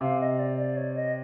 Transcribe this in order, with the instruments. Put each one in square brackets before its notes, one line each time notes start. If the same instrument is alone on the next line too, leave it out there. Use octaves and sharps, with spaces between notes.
[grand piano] C3 [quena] F5
[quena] D#5
D5
D5
C#5
D#5